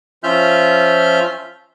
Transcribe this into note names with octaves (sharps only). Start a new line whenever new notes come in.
F3 C#4 F4 E5 F6 G6